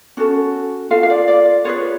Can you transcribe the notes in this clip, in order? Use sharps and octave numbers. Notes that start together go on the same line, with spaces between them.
C#4 F#4 A4
F4 A4 F5
F5
D5
D5
F4 G#4 B4 C#5